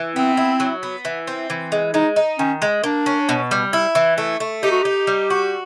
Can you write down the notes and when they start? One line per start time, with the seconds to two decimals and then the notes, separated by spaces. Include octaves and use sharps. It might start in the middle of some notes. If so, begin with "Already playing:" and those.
Already playing: E3
0.16 B3 C4
0.37 E4
0.60 F#3
0.83 B3
1.05 E3
1.27 C4
1.50 E3
1.72 G#3
1.94 G#3 D#4
2.16 D#4
2.39 D#3 C#4
2.62 G#3
2.83 A#3 D4
3.06 C#4
3.29 B2
3.51 G3
3.73 E4
3.95 E3
4.18 A3
4.40 A3
4.63 D#4 G4
4.72 F#4
4.82 D#4 G4
5.07 G3
5.30 F#4